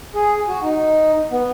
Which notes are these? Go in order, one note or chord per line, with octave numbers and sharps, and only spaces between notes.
G#4
F#4
D#4
B3